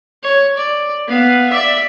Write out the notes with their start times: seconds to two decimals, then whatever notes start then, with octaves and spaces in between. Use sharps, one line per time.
0.23 C#5
0.57 D5
1.08 B3 F5
1.49 D5 E5